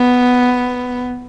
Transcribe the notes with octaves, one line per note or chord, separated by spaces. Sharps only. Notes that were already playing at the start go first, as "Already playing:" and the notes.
Already playing: B3